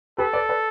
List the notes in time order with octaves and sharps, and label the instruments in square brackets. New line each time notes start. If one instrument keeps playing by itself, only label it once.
[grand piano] G4 B4 [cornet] A4
[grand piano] B4 D5
B4 D5